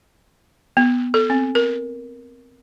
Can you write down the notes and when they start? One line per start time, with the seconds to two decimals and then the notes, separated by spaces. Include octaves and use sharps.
0.77 B3
1.14 A4
1.30 C4
1.55 A#4